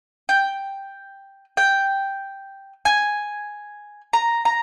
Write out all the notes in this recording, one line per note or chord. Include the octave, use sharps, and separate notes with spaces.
G5
G5
G#5
A#5
A#5